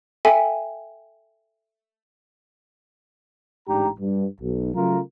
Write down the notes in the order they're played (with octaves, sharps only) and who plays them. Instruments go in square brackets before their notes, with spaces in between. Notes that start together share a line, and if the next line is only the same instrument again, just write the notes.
[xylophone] A4 E5 G5 G#5
[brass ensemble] A1 G#2 D4 G4 A#5
G2
B1
C#3 F#3 A3 F4 A#4